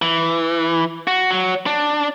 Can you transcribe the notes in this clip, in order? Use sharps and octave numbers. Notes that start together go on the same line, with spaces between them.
E3
F#4
F#3
D4